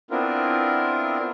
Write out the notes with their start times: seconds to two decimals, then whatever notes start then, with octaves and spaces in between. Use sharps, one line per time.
0.11 B3 C4 D4 E4 F4 A#4